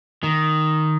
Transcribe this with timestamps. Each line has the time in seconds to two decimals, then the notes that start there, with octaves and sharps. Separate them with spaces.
0.23 D#3